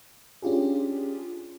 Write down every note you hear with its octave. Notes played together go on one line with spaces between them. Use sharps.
C#4 D4 F4 G4 G#4